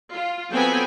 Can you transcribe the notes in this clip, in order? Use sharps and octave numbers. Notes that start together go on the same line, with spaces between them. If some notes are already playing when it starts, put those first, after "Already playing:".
F4
F#3 B3 C4 A4 G5 G#5